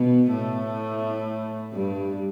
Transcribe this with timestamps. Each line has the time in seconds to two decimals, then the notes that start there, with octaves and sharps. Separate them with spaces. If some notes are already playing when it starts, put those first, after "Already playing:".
Already playing: B2 B3
0.31 A2 A3
1.73 G2 G3